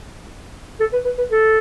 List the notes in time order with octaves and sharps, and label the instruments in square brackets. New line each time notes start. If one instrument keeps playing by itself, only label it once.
[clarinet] A4
B4
B4
B4
A4